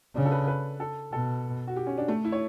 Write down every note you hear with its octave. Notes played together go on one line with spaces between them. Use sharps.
C#3 D4
A4
B4
B4
A4
B2 A4
F#4
G4
C#4
D4
A3
E4
C#5